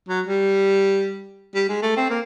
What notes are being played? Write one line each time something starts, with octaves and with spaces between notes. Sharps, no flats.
F#3
G3
G3
G#3
A3
C4
A#3